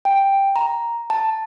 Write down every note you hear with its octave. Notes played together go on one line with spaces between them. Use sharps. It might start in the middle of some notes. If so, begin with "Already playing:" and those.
G5
A#5
A5